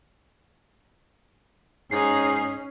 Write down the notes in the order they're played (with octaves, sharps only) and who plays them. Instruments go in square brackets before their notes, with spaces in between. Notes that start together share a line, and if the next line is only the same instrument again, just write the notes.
[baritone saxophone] G#2 [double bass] C#4 [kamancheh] D#4 G#4 [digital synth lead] C7